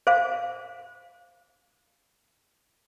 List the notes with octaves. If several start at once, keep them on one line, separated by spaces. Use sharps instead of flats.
C5 F5